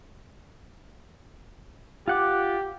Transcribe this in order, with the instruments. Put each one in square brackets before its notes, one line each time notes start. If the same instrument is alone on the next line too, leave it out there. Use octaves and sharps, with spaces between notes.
[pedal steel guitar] F4 F#5 D6 [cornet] G4